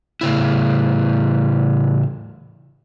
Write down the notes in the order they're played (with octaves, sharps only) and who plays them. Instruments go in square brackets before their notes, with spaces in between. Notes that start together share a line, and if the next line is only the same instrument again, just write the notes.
[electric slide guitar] A2 C#3 E4